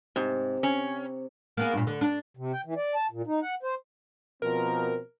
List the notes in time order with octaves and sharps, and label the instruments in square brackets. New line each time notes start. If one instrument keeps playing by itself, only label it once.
[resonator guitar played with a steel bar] G#2 [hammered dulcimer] C3
[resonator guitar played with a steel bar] C#4
[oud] A#3 B3 G#4
G2 A#2
D3
D4
[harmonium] C3
G5
E3
D5
A5
A#2
D#4
F#5
C5
[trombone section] B2 F3 C4 [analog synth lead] A#4